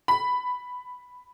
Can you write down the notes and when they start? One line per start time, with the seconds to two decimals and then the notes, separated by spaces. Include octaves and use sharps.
0.08 B5